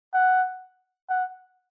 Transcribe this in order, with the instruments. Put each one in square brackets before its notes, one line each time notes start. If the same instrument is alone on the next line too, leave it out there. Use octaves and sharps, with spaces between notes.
[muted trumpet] F#5
F#5